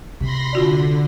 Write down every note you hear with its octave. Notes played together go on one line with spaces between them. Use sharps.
C3 C4 B5 C6 A#6
D3 F4 F#4 D5